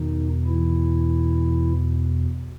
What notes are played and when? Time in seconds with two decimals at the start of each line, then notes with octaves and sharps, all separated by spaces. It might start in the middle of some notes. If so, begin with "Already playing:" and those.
Already playing: E2 B2 D#3 D#4
0.47 E3 E4